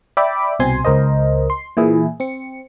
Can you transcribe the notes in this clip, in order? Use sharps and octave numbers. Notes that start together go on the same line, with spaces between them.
D5 E5 G5 B5 D6
C2 B2 C4 G#5 C6
C#2 A#4 C5 D#5
C6
A#2 E3 E4 G#4
C4 C#7